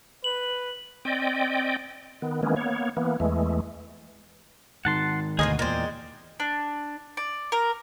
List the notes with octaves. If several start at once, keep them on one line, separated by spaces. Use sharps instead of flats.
B4 F#7
C4 D5 D#5 G5
D#3 B3
D#3 E3 G#3 A#3 B3 C#4
A#3 B3 C#5
E3 A#3 B3
E2 E3 G#3 A3
G#2 D#3 F#5 A5 C6
D2 B2 F4 G#4 A#4 C5 D#5
E2 A#2 G#3 A#4 C5 D5 G5
D4
D5
A#4